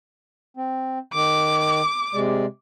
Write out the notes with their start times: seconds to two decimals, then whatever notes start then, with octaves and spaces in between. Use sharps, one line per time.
0.57 C4
1.14 D#3 D6
2.14 C3 G#3 D5